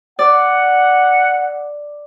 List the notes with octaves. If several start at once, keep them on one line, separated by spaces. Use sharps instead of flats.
D5 F#5